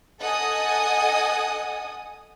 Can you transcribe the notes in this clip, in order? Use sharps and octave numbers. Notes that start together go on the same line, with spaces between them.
A4 D#5 F#5 G#5 D#6